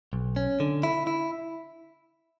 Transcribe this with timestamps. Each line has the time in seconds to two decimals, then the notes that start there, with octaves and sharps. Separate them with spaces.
0.13 B1
0.36 C#4
0.60 D3
0.83 E4
1.07 E4